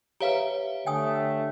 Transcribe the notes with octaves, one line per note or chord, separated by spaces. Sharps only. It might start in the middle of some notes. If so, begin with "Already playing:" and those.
G4 B4 C#5 E5 F5 A#5
D3 A3 G5 G#5 D#6